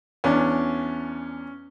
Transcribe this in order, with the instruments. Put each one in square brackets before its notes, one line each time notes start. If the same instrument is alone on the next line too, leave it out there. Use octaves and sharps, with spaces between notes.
[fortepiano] E2 D4 [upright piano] C#4